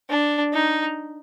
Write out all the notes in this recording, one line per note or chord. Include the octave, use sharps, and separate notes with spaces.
D4
D#4